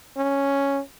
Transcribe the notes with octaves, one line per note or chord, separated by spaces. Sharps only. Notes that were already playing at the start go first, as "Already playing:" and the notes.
C#4